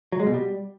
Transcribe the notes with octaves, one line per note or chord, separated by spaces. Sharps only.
F#3
G#3
B2
G3